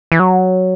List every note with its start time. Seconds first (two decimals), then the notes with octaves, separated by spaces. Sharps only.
0.12 E3
0.20 F#3